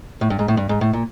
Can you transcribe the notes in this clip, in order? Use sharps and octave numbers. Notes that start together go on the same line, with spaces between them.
A2
G2
G#2
A2
G2
G#2
A2
A#2